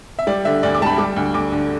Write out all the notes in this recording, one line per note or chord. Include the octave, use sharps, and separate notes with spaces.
E5
G3 D5
D3 E5
D2 D5
D6
G3 A5 B5
G3 D6
D2
D2 D6
D3